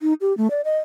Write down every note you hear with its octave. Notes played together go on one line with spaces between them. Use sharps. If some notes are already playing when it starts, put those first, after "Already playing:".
D#4
G4
A3
D5
D#5